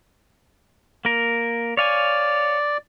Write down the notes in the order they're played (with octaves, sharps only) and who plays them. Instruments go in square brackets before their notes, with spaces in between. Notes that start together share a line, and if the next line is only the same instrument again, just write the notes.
[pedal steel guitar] A#3 A#4
[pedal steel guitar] C#5 F5 G#5 [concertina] D5